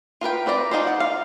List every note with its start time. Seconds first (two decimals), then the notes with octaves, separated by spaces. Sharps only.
0.21 F4 A#4 B4 G5
0.46 C4 B4 D5 F5 A#5
0.71 D4 D#4 F4 C5
0.87 F#5
1.00 F5